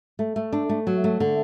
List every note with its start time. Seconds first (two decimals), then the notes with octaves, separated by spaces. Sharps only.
0.19 A3
0.36 A3
0.53 D4
0.69 A3
0.87 F#3
1.04 A3
1.20 D3